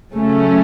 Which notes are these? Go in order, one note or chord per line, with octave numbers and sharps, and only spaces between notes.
C#3 F#3 A3 C#4